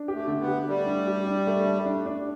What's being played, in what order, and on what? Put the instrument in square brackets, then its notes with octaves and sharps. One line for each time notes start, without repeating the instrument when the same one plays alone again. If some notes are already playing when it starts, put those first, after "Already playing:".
Already playing: [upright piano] D4
G4
[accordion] A3
[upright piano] D3
[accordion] B3
[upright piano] G4
[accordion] G3 [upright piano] A3
[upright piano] D4
G4
D4
A3
A3
D4
D4